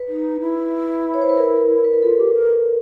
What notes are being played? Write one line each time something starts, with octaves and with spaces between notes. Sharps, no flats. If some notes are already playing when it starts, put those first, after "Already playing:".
Already playing: B4
D#4
E4
C#5
C5
B4
A#4
B4
A#4
F4 A4
G4
A#4